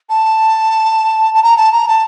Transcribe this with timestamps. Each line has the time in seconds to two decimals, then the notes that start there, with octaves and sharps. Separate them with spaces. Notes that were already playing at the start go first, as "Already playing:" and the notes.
0.09 A5
1.34 A5
1.43 A#5
1.57 A5
1.72 A#5
1.88 A5